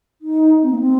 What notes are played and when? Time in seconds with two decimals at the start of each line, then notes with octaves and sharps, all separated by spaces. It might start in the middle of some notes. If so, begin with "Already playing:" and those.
0.22 D#4
0.63 C4
0.71 A#3
0.79 C4